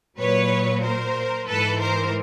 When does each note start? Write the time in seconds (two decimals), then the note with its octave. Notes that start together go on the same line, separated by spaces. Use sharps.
0.18 A#2 F#3 B4 C#5
0.83 A#4 C5
1.48 G#2 E3 A4 B4
1.80 A#4 C5